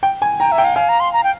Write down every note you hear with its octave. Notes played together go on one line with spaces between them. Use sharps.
G5
G#5
G5 A#5
E5
G5
F5
F5 G#5
A#5
C6
A#5
G5